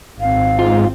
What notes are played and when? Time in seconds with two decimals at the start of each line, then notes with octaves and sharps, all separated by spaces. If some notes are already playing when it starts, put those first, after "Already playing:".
0.20 G#1 C4 F5
0.59 G#2 F4